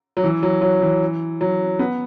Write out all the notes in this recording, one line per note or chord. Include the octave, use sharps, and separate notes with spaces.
F#3
E3
F#3
F#3
E3
F#3
B3